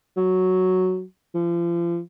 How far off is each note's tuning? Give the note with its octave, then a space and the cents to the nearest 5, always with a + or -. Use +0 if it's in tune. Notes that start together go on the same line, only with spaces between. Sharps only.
F#3 +0
F3 -35